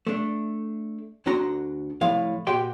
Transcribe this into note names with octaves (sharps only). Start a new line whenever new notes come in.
A3 D4
D2 D3 D4 F#4 A#5 C6
C2 A2 F3 F5
A#2 F#4 G4 G5 C6